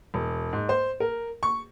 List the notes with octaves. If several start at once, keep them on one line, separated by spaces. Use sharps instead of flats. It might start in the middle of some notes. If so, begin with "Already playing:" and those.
E1
G#2
C5
A#4
C#6